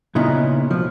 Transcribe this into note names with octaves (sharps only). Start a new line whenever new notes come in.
A#2 C#3 B3 D#4 E4
B1 F3